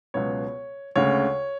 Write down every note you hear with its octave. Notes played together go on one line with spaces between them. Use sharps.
C#2 B2 F#3 B3 C#5
D2 C#3 G#3 C#5